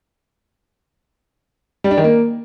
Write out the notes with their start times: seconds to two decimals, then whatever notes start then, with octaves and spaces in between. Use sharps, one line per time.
1.84 G3
1.91 D4
1.98 D#3
2.04 A#3